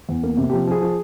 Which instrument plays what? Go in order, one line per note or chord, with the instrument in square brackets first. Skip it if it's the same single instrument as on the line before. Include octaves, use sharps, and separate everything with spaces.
[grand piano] E2
A#3
C3
F3 G4
F3 G#4
F3